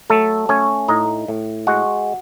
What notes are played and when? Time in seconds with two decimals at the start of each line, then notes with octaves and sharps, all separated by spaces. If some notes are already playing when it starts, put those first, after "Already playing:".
0.10 F#3 A3 A4
0.49 A3 C#4 C#5
0.88 A2 D#4 D#5
1.28 A2
1.67 G#3 F#4 F#5